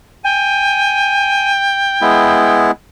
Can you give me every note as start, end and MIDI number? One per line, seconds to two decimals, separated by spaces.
0.24 2.59 79
0.24 1.52 80
2.01 2.71 56
2.01 2.71 59
2.01 2.71 64